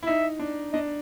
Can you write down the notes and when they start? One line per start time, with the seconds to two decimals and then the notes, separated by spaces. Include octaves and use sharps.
0.03 E4
0.06 D#4 E5
0.39 D4
0.73 D4 D#5